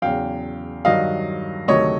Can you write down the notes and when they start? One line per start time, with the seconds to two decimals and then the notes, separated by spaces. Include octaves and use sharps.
0.02 E2 C#3 F#3 F5 G5
0.85 G2 D#3 F#3 D#5 F5
1.68 D2 C3 D#3 F#3 A3 C#5 D#5